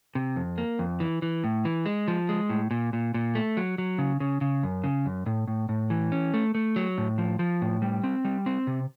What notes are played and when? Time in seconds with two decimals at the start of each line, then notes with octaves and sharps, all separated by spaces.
0.15 C3
0.36 F2
0.58 A#3
0.79 F2
1.00 E3
1.22 E3
1.44 A2
1.65 E3
1.86 G#3
2.08 F3
2.29 G#3
2.49 A2
2.71 A#2
2.93 A#2
3.14 A#2
3.35 A3
3.57 F#3
3.78 F#3
3.98 C#3
4.20 C#3
4.41 C#3
4.63 F#2
4.84 C#3
5.06 F#2
5.26 A2
5.48 A2
5.69 A2
5.90 E3
6.12 C#4
6.34 A3
6.55 A3
6.76 F#3
6.98 A2
7.18 F3
7.39 F3
7.62 A2
7.82 G3
8.04 C4
8.25 G3
8.46 C4
8.67 C3